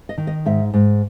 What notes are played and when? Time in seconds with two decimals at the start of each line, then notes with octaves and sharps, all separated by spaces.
0.09 D#5
0.18 D#3
0.27 D#5
0.46 G#2 E5
0.74 G#2